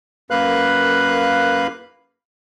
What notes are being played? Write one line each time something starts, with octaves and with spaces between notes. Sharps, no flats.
F#2 A#3 B4 F5 F#6